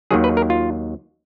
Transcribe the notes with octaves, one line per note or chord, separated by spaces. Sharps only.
D#2 D#3 F#3 G#4
B4
A#4
F4